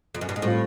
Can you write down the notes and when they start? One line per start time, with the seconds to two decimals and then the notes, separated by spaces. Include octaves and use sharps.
0.15 F2
0.21 F#2
0.29 G2
0.36 G#2
0.42 A2 G3 C4 F4